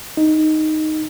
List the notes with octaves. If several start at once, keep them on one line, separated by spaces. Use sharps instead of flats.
D#4